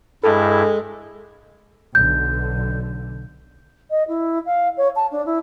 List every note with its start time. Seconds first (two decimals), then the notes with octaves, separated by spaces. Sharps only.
0.23 G2 G#3 E4 A4
1.95 B1 D3 G6
3.90 D#5
4.08 E4
4.46 F5
4.77 C#5
4.95 A5
5.11 D4
5.26 E4